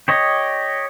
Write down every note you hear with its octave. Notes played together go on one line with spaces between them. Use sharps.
G4 C#5 D#5